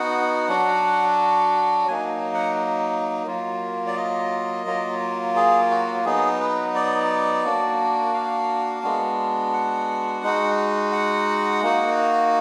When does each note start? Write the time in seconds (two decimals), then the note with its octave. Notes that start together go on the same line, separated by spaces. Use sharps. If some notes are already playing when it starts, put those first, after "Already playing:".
Already playing: B3 D#4 F#4 F#5
0.49 F#3 D4 F#4
1.87 F#3 A#3 D#4 G#5
2.34 F#5
3.27 F#3 A#3 F4
3.87 D5
3.97 D#5
4.66 F#3 A#3 F4
5.36 G#4
5.70 F#4
6.05 F#3 B3 D#4 G#4
6.40 B4
6.75 D5
7.44 A#3 D4 F#4
8.14 F5
8.83 G#3 B3 D4 F#4
9.53 F#5
10.23 G#3 D#4 F#4
10.93 F#5
11.63 A#3 D#4 F#4